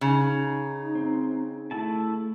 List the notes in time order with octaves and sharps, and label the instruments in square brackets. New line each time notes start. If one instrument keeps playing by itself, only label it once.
[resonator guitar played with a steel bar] C#3 [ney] D#4
[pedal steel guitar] C4
A3 E4 A5